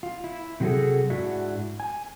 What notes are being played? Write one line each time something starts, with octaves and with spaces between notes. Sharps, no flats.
F4
E4
C3 F#3 A3 F#4 G#4 A4
G#2 D4 E4 F#4 E5
G#5